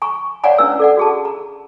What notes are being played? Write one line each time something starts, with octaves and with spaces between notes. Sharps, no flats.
G#5 A#5 C#6
C#5 D5 F5 F#5 G#5 A#5
C#4 D4 E4 B4 E6
A4 D5 F#5
F#4 G#4 A5
A#5